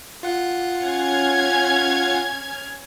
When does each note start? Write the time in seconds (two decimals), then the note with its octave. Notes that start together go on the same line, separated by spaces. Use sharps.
0.23 F4 F#5
0.82 C#4 F6 G#6